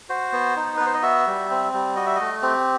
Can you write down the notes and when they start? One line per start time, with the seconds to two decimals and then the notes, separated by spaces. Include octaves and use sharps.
0.09 F#4 C5
0.33 B3
0.56 D#4
0.77 B3 B4
0.86 C5
0.94 D#5
1.03 F#4 E5
1.27 G3
1.50 C4
1.73 G3
1.96 F#4 D#5
2.06 E5
2.16 A3 D#5
2.42 C4 G4